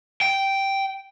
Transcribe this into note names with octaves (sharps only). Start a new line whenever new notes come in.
G5